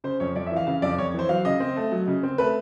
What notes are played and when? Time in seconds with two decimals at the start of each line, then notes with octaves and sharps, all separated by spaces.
0.04 C#3 C5
0.20 F2 C#5
0.36 F2 D5
0.46 E5
0.52 E3 F5
0.67 C#3 F5
0.82 F2 D5
0.98 F2 C#5
1.14 E3 C5
1.29 F#3 F5
1.45 C#3 D#5
1.60 C4
1.76 A3
1.92 F#3
2.08 C#3
2.23 C4
2.38 A3 B4